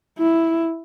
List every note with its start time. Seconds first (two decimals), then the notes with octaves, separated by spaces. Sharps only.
0.19 E4